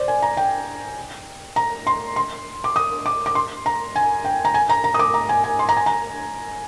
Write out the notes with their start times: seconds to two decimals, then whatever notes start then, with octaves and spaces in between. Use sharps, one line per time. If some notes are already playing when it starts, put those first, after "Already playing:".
Already playing: C5 D5
0.08 G#5
0.22 A#5
0.37 G5
1.56 A#5
1.87 C6
2.16 C6
2.64 D6
2.76 D#6
3.06 D6
3.26 D6
3.35 C6
3.66 A#5
3.96 G#5
4.25 G5
4.45 A#5
4.54 G#5
4.70 A#5
4.84 A#5
4.94 D#6
4.99 D6
5.14 A#5
5.29 G#5
5.44 G#5
5.59 C6
5.69 A#5
5.77 G#5
5.86 A#5